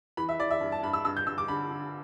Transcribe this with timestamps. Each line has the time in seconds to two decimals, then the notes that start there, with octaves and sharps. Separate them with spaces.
0.17 E3 B5
0.29 E5
0.39 E3 D5
0.51 E5
0.61 G2
0.72 A5
0.83 G2 B5
0.93 E6
1.05 G2 E6
1.17 G6
1.27 G2 E6
1.38 D6
1.48 D3 B5
1.71 D3